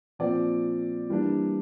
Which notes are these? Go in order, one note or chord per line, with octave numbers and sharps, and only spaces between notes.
A#2 F3 C4 D5
E3 G3 A#3 D4